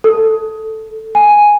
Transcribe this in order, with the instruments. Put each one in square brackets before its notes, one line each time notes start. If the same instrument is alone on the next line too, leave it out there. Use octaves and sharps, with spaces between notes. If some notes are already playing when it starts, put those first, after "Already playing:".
[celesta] A4
G#5